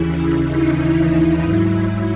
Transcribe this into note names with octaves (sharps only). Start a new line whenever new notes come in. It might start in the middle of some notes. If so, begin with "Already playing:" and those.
Already playing: D#2 C#3 E3 E4
D#4
G#2 F#3 E4